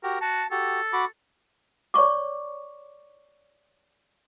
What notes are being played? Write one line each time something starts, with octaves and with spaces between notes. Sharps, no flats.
F#4 G4 A#4
F#4 A5
F#4 G4 A4
F#4 B5 D6
C#5 D5 C#6 D6